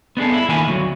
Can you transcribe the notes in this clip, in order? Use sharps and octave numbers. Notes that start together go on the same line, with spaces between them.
B3 D4 G#4 A4
E4
D#3 A#3 F4 E5 G#5 B5
D2 F#3